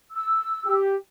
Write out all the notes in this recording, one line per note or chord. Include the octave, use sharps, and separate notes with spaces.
E6
G4